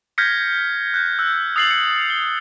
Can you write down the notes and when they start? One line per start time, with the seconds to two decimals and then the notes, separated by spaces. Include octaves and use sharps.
0.18 F6 G6 G#6 A#6 B6 C#7
0.94 F#6 G6
1.19 E6 F#6
1.56 D#6 E6 A6 C7 F7 F#7
1.70 C#7 F#7
2.10 G7